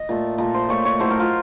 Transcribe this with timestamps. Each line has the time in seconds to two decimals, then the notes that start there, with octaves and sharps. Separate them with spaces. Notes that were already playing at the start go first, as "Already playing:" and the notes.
Already playing: D#5
0.09 A#2 A3
0.38 A#2 A3
0.54 C5
0.69 A#2 A3 C#5
0.85 C#5
0.99 A2 F#3 A3 C5
1.10 A#4
1.20 F4